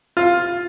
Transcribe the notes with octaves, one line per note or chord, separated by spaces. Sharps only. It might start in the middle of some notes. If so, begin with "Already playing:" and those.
F4